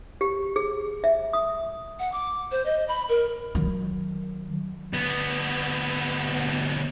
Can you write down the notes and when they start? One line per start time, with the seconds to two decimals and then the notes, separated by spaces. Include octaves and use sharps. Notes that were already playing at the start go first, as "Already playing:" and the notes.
0.21 G4
0.56 G#4
1.04 E5
1.33 D#6
1.99 F#5
2.12 D6
2.51 C5
2.65 D#5
2.88 B5
3.09 A#4
3.55 D#3 F#3
4.93 D2 B3